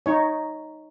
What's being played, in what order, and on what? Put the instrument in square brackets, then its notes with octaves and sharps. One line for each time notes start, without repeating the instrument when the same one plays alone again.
[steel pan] D#4 C#5